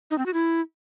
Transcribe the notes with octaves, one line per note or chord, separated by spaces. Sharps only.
D#4
C4
F#4
E4